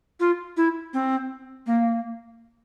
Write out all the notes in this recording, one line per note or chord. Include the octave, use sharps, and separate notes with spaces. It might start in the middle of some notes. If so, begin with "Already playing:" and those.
F4
E4
C4
A#3